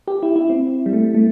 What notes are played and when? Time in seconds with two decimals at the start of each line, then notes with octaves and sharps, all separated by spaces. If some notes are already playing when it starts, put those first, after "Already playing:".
0.08 G4
0.23 E4
0.36 E4
0.50 C4
0.86 G3
0.93 A3
1.14 A3